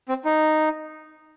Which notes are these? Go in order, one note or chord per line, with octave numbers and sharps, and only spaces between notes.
C4
D#4